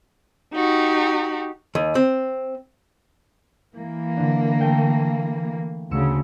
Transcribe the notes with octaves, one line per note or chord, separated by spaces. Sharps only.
D#4 F#4 G4
D#2
C4
E3 A#3
D3 D4
A3 G5 C#7
D2 C#3 E6 C#7 E7